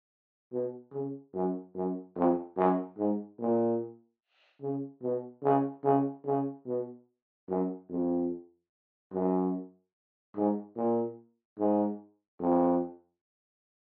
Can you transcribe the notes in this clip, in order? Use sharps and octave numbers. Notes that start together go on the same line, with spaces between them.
B2
C#3
F#2
F#2
F2
F#2
G#2
A#2
C#3
B2
C#3
C#3
C#3
B2
F#2
F2
F#2
G#2
A#2
G#2
F2